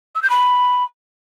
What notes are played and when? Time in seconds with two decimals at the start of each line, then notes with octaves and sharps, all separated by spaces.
0.15 E6
0.22 G6
0.30 B5